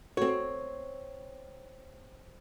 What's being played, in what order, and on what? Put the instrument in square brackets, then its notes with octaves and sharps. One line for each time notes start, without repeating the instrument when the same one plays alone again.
[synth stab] A3 F#4 [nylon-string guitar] C4 C#5